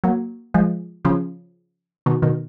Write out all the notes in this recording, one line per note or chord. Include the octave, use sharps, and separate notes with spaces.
F#3 A#3
F3 G#3
C#3 F3
B2 D#3
B2 D#3